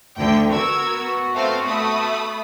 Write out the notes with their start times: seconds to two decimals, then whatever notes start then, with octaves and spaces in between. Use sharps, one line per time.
0.18 D2 D3 G5
0.50 B3 F#4 A#4 E6 G#6
1.34 A3 C4 F5
1.64 A3 B5 D#6